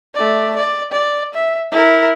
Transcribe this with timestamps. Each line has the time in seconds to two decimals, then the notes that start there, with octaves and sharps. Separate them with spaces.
0.14 A3 D5
0.56 D5
0.92 D5
1.34 E5
1.71 E4 A#4